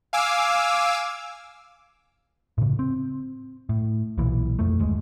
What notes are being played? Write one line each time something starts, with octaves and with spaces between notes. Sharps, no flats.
F5 G#5 D6 E6
A2 C#3
C4
A2
B1 A#2 E3
F2 A3
G1 D#2 G#3